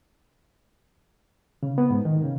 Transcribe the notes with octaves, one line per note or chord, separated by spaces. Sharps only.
C#3
B3
G#2
D#3
C#3